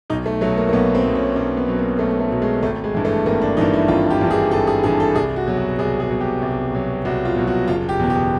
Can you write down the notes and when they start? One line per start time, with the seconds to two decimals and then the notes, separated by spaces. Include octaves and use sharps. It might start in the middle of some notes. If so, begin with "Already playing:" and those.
0.10 B1 D#4
0.26 A3
0.41 B2 F#3 A3
0.57 A#3
0.69 A#3
0.73 B1 B3
0.95 C4
1.04 B2 F#3
1.15 C#4
1.36 B1 C#4
1.57 B3
1.68 B2 F#3
1.79 A#3
1.99 B1 A3
2.20 A3
2.30 B2 F#3
2.42 G#3
2.62 G#1 A3
2.84 G#3
2.95 G2 E3
3.05 A3
3.26 G#1 A#3
3.42 D4
3.57 G2 E3 D#4
3.74 E4
3.88 G#1 F4
4.10 G4
4.21 G2 E3
4.31 G#4
4.51 G#1 A4
4.67 G#4
4.83 G2 E3 G#4
5.00 A4
5.15 C2 G#4
5.36 F#4
5.46 B2 F#3
5.57 F#4
5.78 C2 G#4
6.00 G#4
6.10 B2 F#3
6.21 G4
6.42 C2
6.73 B2 F#3
7.05 C2 F#4
7.25 F4
7.36 B2 F#3
7.47 F#4
7.68 F#1 F4
7.89 G4
7.99 E2 B2
8.10 G4